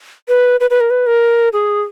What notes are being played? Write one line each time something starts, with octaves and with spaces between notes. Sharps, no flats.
B4
B4
B4
A#4
B4
A#4
G#4